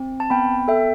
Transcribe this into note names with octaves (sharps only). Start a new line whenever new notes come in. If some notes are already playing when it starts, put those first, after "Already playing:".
Already playing: C4
A5
B3 G5 B5
A4 E5 G5